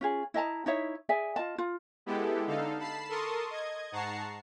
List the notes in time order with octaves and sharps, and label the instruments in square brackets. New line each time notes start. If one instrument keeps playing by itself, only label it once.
[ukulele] C#4 F4 G#4
E4 D#5 A5 A#5
D#4 E4 C#5 E5
G#4 D5 E5 G#5
F4 D#5 A5
F4
[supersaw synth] G#3 B3 E4 G4 A4
D3 D#4 A4 F5
A5 B5 C7 E7
A4 A#4 A5 C6 C#6 D#6
D#5 G#6
G#2 F#5 A5 A#5 C#6 C7